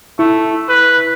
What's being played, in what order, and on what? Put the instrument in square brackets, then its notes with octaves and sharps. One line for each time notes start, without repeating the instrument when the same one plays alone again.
[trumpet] A3 [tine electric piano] E4
[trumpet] B4